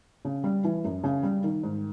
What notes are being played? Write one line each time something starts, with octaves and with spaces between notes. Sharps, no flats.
C#3
G3
E3
F#2
C#3
G3
D#3
G#2